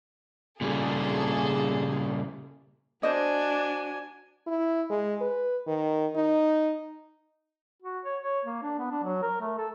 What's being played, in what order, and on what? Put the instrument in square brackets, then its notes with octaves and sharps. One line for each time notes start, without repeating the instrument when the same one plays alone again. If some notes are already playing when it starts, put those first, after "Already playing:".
[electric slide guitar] A#2 C#3 G3 [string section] A#3 G#4 A4
[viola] D4 [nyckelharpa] F#4 G#5 [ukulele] C5 D#5
[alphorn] E4
G#3
B4
D#3
D#4
[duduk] F#4
C#5
C#5
A#3
D4
B3
D4
F#3
A#4
A3
A4